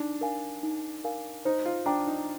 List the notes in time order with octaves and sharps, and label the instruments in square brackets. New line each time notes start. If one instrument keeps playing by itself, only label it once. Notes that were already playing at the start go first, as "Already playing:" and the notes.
Already playing: [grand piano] D4 [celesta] D#4
[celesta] A#4 F5 G#5
D#4
A#4 F5 G#5
[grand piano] D#4 [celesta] C5
[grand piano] F4
[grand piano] D4 [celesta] G5 A#5 D6
[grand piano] D#4